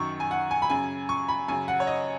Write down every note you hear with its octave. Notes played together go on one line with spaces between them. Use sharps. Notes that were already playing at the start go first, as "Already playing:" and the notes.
Already playing: F#2 D#3 C#6
G#5
F#5
G#5
B5
F#2 C#3 G#5
C#6
B5
F#2 C#3 G#5
F#5
C#5
D#5